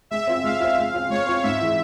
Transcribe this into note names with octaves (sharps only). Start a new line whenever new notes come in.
G#3 E5
C4 F4
G#3 F5
C4 F4
G#3
C4 F4
G#3 C#5
C4 F4
G#2 E5
E3 G#3